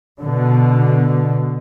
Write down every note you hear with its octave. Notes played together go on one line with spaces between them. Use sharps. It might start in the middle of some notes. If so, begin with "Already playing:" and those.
B2 D3